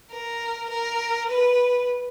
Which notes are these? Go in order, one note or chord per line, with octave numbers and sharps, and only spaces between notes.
A#4
A#4
B4